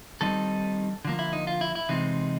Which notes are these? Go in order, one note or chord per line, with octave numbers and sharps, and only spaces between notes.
D#3 G3 C4 D#4 A4
D3 F3 A#3
E4
D#4
F4
E4
E4
C3 E3 G#3 C4 D#4